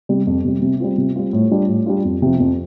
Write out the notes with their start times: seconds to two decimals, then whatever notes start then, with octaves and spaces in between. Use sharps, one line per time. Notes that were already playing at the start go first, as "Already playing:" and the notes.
0.09 C3 G3
0.27 F2
0.45 C3 G3
0.62 C3
0.80 G3 C4 F4
0.98 C3
1.16 G3 C4 F4
1.33 A2
1.51 G3 D4 F4
1.68 A2
1.86 G3 D4 F4
2.05 F2
2.22 C3 F3
2.40 F2